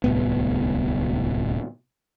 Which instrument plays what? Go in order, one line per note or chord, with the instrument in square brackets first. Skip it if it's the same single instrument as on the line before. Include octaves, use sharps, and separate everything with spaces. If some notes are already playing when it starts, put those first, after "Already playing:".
[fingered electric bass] D1 C2 A2 B3